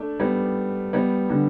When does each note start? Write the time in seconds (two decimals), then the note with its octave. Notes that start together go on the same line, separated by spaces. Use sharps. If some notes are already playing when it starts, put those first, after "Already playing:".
Already playing: A3 D4
0.19 G3 B3
0.93 G3 B3
1.30 D3 G3